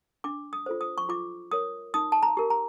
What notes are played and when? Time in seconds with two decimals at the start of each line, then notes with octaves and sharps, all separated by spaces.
0.24 D4 D6
0.53 D#6
0.66 F4 A4 C5
0.81 D#6
0.98 C#6
1.09 F4 D6
1.51 A#4 C#5 D#6
1.94 D#4 D#6
2.12 A5
2.23 A#5
2.37 G4 A#4
2.50 A#5